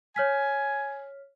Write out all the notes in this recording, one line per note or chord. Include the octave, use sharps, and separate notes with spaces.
C#5 G#5 F6 B6